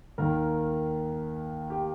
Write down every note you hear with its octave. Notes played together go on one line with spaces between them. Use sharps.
D#2 D#3 A#4
G4